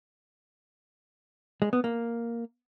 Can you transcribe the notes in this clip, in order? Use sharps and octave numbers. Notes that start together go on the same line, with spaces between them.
G#3
B3
A#3